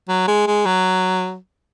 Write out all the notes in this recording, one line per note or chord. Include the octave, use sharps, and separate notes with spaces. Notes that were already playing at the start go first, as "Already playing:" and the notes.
F#3
G#3
G#3
F#3